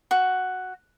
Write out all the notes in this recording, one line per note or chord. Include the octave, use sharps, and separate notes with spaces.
F#4